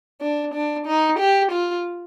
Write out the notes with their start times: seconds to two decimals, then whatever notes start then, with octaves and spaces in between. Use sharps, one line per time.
0.21 D4
0.54 D4
0.87 D#4
1.19 G4
1.52 F4